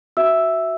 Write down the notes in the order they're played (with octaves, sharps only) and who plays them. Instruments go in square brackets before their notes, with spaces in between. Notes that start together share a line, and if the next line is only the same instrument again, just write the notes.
[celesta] F#4 E5 E6